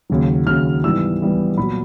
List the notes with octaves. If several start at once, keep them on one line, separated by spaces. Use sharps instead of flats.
D#2 C#3 F#3
D#2 C#3 F#3 F6
G#2 E3 G3 B3 E6
G#2 E3 G3 B3
A#2 F#3 B3 B5